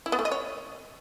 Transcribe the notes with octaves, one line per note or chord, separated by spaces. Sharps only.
E4
B3
A3
D#5
C#5